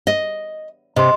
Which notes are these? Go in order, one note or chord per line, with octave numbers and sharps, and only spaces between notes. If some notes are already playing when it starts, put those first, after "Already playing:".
D#5
C3 D#5 C6